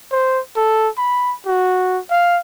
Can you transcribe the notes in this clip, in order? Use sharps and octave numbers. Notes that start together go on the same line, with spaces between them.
C5
A4
B5
F#4
F5